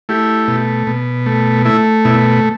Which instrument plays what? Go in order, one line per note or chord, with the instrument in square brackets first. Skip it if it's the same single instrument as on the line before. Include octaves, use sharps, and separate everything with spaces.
[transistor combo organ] A3 E4 G4
B2
B2
A3
A3 E4
B2 E4